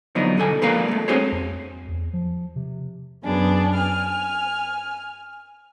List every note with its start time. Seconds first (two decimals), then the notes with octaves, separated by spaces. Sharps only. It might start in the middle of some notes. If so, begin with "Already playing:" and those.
0.15 D3 F3 F#3 B3 D4 D#4
0.37 B1 G2 D3 A4 G#5
0.62 F3 G#3 A#3 D4 B4 F5
0.88 G#3 A3
1.08 C4 D4 F#4 G#4 C5 C#5
1.32 F2
1.88 E2
2.13 F3
2.56 C3
3.23 F#2 B3 D4 G#4
3.73 G#5 F6